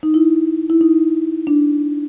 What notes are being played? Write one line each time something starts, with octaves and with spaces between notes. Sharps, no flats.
D#4
E4
E4
D#4
D4